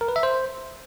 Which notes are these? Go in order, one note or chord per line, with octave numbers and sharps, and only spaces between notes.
A#4
B4
E5
C5